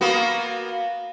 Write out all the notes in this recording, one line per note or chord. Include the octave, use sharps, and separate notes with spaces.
A#3 B3 F#4